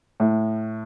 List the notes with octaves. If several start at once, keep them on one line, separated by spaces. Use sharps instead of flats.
A2